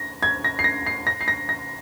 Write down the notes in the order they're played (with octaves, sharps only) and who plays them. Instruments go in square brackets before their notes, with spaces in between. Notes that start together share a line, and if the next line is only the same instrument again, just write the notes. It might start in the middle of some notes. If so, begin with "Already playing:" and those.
Already playing: [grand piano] A#6
G#6
A#6
C7
A#6
C7
A#6
C7
A#6
A#6